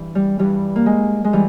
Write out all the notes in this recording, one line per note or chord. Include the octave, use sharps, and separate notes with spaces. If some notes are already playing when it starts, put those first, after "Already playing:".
Already playing: G2 E3
G3
G2 E3 G3
A#3
G#3
G#3
E3 G3